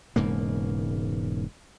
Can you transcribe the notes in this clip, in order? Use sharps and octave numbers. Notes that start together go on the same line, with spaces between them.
E1 G#2 C#3 A#3